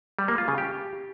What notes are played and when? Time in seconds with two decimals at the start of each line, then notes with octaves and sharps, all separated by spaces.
0.19 G3
0.28 A#3
0.38 F4
0.48 C#3
0.58 G4